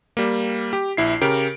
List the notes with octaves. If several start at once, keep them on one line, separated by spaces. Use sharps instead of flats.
G3 A#3
G4
A#1 E4 C7
C#3 G4 A#4 D7